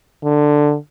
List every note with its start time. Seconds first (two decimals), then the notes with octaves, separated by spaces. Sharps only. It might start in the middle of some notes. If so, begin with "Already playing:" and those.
0.24 D3